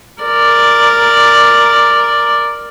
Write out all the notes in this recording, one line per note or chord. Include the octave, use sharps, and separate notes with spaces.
A#4 D5